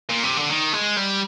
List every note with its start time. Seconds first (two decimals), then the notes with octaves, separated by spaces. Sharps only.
0.10 A#2
0.24 C3
0.37 D3
0.50 D#3
0.73 G#3
0.97 G3